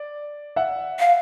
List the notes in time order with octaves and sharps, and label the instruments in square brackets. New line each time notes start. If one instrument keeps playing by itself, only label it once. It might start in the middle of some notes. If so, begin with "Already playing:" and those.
Already playing: [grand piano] D5
E5 F#5
[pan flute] F5